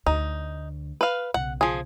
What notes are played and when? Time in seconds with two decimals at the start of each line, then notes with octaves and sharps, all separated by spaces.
0.06 D2 D#4
1.01 B4 F5
1.34 B1 C#3 F#5
1.61 F3 G#4